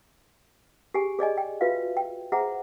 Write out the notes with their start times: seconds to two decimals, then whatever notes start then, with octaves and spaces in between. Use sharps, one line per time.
0.94 G4 G#4 G#5
1.19 G#4 D5 D#5 G#5
1.37 G5
1.61 F4 F#4 B4 E5 F5
1.97 G5
2.32 G#4 C5 E5 F#5 A#5